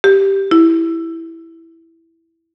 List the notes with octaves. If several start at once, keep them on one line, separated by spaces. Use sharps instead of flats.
G4
E4